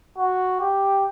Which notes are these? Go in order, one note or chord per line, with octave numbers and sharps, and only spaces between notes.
F#4
G4